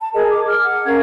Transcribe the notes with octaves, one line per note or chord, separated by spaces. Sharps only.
A5
G#4 A#4 D#5
D6
F6
F#5
C#4 A#4 F5 G#6